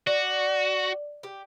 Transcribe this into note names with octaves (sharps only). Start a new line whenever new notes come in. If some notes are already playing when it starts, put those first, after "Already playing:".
F#4 D5
G4